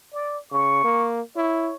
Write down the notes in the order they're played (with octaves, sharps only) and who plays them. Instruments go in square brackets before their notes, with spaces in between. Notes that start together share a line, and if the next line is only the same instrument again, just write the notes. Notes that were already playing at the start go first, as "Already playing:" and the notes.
[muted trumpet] D5
[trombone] C#3 [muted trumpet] C#6
[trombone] A#3
[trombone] E4 [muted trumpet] C#5